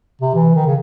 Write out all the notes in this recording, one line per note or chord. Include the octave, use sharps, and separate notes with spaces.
C3
E3
D#3
C#3